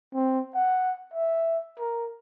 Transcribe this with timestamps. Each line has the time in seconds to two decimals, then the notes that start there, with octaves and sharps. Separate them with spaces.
0.14 C4
0.55 F#5
1.14 E5
1.79 A#4